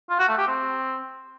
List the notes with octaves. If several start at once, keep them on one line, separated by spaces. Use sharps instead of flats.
F4
F#4
A3
G4
C4